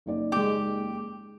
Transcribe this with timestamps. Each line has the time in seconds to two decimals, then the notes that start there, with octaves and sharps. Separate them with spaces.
0.06 F#1 D#4 D5
0.32 G#3 G4 G5